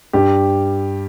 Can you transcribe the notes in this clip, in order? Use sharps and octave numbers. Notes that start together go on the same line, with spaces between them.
G2 G4